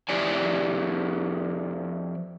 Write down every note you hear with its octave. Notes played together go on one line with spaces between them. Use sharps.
F2 G#2 E4 G4 D5 G#5